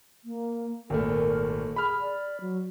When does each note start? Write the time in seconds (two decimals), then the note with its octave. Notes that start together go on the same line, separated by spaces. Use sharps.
0.25 A#3
0.90 G#1 A#2 A3 A#4
1.76 G#4 B5 F6
2.00 D5
2.41 F#3